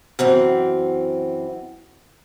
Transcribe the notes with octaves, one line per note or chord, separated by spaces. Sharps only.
F#2 E3 C4